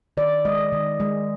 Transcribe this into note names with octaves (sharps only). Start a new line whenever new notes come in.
D#3 D5
G#3 D#5
D#3
G#3